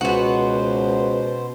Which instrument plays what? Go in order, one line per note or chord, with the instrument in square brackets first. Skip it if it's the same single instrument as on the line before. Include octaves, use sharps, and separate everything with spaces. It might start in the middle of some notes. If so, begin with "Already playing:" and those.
[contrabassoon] C#2 [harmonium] B2 C5 [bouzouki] B3 F#4